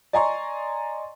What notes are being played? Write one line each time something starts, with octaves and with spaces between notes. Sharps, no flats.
D5 D#5 G#5 A#5 C6 C#6